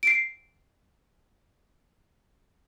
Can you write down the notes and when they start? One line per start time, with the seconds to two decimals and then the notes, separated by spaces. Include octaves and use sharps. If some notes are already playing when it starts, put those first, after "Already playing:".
0.03 C7 D7